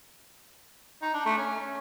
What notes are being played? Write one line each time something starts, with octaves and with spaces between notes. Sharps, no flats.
D#4
D4
A3
C#4